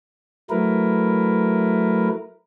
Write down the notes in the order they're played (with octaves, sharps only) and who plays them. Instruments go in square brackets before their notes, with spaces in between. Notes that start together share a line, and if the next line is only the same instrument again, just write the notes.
[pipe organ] F#3 A3 E4 A#4 B4